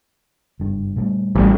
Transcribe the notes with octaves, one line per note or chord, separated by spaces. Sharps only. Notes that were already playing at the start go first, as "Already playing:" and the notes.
F#1 G2
A#2 G3 A3
A1 G3